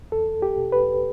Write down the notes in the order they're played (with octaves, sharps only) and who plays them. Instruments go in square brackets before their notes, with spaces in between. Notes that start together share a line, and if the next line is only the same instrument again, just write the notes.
[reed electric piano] E2 A4
G4
B2
B4